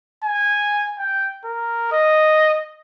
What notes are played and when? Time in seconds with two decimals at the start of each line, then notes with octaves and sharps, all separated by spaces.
0.24 G#5
0.99 G5
1.45 A#4
1.92 D#5